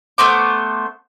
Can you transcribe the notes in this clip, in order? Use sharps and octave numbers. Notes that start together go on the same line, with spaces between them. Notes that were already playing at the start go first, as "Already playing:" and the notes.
A3 B3 C5 D6